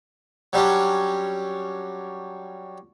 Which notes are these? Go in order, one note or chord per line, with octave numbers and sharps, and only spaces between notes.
F#3 G3 C#4 D4